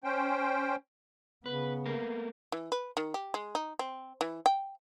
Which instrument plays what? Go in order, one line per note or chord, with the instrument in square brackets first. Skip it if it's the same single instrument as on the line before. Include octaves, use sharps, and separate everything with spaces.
[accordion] C#4 C5 G5
[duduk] C#3 [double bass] B3 [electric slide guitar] B4
[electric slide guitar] A3 A#3 A#4
[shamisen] E3
B4
D#3
G4
G#3
D#4
C4
E3
G5